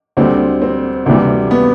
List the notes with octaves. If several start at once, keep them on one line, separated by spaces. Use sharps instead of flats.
D2 D3 G3 C4
C4
D2 C3 E3 G3
B3